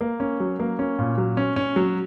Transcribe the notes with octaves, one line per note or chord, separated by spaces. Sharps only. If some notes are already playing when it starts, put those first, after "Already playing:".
A#3
C#4
F#3
A#3
C#4
A#2
F#3
C#4
C#4
F#3